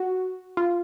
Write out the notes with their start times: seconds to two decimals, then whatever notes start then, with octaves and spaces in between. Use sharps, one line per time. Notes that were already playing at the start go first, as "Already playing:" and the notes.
Already playing: F#4
0.57 F4